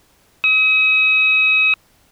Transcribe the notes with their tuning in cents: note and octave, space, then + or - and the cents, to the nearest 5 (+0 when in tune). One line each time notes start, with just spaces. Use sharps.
D#6 +40